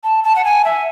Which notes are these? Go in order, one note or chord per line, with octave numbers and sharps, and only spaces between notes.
A5
A5
F#5
G#5
E5